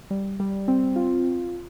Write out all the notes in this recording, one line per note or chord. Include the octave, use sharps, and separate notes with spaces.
G3
G3
C4
F4